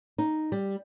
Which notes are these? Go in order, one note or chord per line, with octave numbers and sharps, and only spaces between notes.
D#4
G3